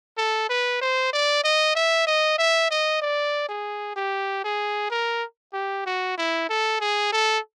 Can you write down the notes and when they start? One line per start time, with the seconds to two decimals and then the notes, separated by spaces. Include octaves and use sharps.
0.18 A4
0.50 B4
0.81 C5
1.13 D5
1.44 D#5
1.75 E5
2.07 D#5
2.38 E5
2.71 D#5
3.02 D5
3.49 G#4
3.96 G4
4.44 G#4
4.90 A#4
5.54 G4
5.86 F#4
6.18 E4
6.49 A4
6.81 G#4
7.12 A4